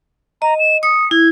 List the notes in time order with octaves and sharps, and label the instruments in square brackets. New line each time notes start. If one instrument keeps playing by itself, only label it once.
[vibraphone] D#5 [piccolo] A#5
[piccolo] E7
[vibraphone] D#6 [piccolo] C#7
[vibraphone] E4 [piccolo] G#6